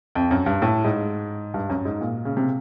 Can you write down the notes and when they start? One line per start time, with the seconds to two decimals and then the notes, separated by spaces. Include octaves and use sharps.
0.15 F2
0.31 F#2
0.46 G2
0.62 A2
0.84 G#2
1.54 G2
1.70 F#2
1.85 G#2
2.01 A#2
2.25 C#3
2.37 C3